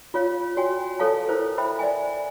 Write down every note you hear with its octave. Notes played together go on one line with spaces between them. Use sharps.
F4 C#5 F5
F#4 C#5 G5 G#5
A4 C#5 F5 A5
E4 A#4 C5
C5 E5 G5 B5
D5 E5 G#5